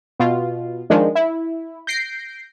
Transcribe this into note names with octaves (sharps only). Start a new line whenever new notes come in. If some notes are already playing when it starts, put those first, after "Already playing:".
B2 F4
D#3 F3 G#3 D4
E4
G6 A#6 C7 D7